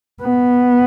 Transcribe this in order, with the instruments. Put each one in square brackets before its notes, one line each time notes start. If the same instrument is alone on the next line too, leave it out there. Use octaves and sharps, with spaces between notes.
[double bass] B3